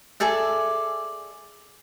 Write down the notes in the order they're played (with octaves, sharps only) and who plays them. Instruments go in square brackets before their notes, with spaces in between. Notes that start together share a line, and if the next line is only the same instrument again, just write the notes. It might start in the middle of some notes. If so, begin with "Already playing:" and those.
[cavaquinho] G#4 A4 D5 E5